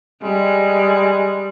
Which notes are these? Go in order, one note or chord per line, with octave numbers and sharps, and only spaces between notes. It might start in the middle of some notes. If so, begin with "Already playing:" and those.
G3 G#3